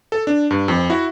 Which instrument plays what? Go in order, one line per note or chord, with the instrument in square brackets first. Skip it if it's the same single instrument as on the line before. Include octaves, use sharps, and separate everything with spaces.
[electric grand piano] A4
D4
G2
F2
E4 F#4